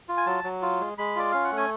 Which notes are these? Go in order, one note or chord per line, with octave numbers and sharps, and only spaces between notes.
F4
G#5
F#3 A5
F#3
F4
G#3
G#3 B5
F4 D5
C#4 F5
F#5
A3
G#5